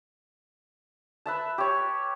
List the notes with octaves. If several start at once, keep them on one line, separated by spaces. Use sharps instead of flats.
B4 E5 A5
G4 C#5